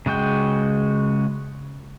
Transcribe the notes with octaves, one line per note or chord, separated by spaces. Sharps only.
C#3 G#3 F#4 G5